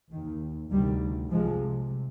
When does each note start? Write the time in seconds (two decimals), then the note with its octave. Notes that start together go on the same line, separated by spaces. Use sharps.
0.11 D#2 D#3
0.71 D2 C3 D#3 G3
1.31 C2 C3 F3 G#3